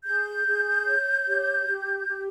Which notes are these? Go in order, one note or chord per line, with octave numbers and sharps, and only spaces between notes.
G#4 G6
G#4
C#5
G4
G4
G4